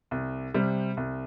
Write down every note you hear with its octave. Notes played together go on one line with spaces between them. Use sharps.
C2
C3 G3
C2